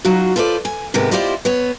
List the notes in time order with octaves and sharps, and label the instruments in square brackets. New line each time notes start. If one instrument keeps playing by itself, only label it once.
[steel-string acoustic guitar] F#3 D#4 F4 F#4
F4 A4 B4 C5 D5
G#5
G#2 C3 D#3 G#3 B3
E4 F4 G4 C5 D5 D#5
B3 C#5